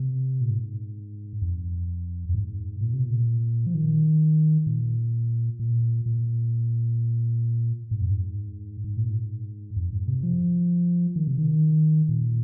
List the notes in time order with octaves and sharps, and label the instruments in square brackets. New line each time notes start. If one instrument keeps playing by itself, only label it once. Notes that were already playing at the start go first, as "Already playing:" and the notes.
Already playing: [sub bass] C3
A#2
G#2
F2
F2
G#2
A#2
C3
A#2
F3
D#3
A#2
A#2
A#2
G#2
F2
G#2
G#2
A#2
G#2
F2
G#2
C3
F3
D#3
C3
D#3
A#2